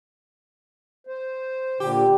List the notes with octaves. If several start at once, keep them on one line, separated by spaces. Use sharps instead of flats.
C5
A#2 D3 G4